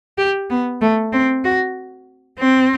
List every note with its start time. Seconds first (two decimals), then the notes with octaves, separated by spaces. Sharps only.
0.18 G4
0.50 B3
0.81 A3
1.13 C4
1.45 F#4
2.39 C4